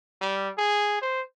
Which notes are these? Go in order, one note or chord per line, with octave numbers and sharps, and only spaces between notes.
G3
G#4
C5